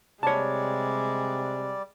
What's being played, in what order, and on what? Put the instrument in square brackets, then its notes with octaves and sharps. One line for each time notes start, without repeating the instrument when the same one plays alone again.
[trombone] C3 [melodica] G3 D5 [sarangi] G#3 [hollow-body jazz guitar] C#5 A5